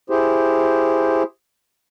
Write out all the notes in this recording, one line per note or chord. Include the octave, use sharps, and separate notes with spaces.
E4 G4 G#4 C5